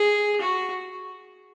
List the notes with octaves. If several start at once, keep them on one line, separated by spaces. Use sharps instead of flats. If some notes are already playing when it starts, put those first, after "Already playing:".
Already playing: G#4
F#4